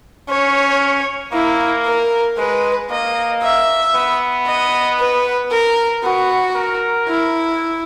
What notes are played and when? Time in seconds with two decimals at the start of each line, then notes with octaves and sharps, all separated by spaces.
0.29 C#4 C#5
1.33 A#3 E4
1.85 A#4
2.38 G#3 B4
2.90 A#3 D#5
3.42 E5
3.95 B3
4.47 D#5
4.99 B4
5.51 A#4
6.03 B3 F#4
6.56 A#4
7.08 E4